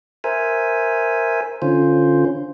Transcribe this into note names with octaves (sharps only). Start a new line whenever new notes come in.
A#4 C5 E5 G#5
D3 C#4 F4 C5